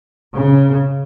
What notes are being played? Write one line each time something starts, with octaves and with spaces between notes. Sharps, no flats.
C#3